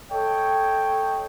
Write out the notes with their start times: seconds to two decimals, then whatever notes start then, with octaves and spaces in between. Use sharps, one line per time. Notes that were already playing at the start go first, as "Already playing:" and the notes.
0.11 A4 C#5 D#5 G5